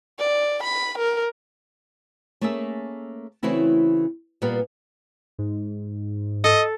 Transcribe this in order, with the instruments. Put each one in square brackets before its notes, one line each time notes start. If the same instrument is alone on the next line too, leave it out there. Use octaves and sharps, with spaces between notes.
[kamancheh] D5
B5
A#4
[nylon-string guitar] A3 A#3 C#4 G#4 A#4 E5
C#3 E3 A3 C4 E4 F#4
A#2 G3 A#3 B3 B4 F5
[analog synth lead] G#2
[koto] A4 [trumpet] D#5